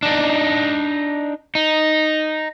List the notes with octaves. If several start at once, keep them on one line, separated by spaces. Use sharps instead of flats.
D4 D#4
D#4